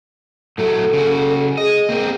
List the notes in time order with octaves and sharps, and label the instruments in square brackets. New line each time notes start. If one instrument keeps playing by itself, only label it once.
[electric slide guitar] A2 F#3 A3 [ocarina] A4
[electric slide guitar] C#3 F#4
[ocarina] G#4 [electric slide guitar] D#5
[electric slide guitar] A#3 C4 A#4